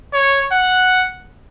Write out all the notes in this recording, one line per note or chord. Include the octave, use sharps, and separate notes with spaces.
C#5
F#5